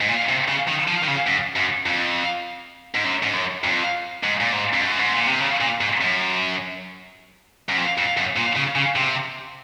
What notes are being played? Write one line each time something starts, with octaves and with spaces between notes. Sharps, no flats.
G#2
A#2
C3
C#3
D#3
F3
D#3
C#3
F#2
F#2
F2
G#2
F#2
G#2
F#2
F2
G#2
A#2
G#2
F2
F#2
G#2
A#2
C3
C#3
A#2
G#2
F#2
F#2
F2
F2
F#2
A#2
C#3
C#3
C3